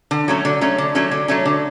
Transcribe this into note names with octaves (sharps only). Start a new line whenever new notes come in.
D3
F#3 A3 C#4
D3
F#3 A3 C#4
D3
F#3 A3 C#4
D3
F#3 A3 C#4
D3